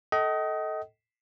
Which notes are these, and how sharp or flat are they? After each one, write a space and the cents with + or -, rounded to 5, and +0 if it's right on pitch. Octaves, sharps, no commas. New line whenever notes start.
A4 +0 D#5 +20 G5 -45